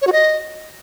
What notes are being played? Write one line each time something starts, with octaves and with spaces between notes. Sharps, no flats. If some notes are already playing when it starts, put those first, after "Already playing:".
C#5
F#4
D#5